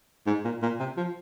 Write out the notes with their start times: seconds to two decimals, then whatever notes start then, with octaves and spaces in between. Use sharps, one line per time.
0.27 G#2
0.44 A#2
0.62 A#2
0.80 C3
0.97 F3